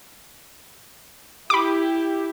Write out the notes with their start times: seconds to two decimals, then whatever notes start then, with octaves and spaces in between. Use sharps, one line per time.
1.50 E4 G4 B5 D6